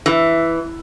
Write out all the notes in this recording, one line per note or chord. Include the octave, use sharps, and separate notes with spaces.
E3